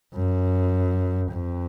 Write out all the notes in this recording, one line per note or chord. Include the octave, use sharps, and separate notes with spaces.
F#2
F2